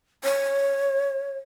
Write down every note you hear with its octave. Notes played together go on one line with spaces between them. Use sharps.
C#5